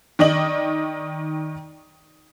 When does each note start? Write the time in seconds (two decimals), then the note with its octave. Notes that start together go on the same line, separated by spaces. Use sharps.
0.19 D#3 D5 D#5 F#7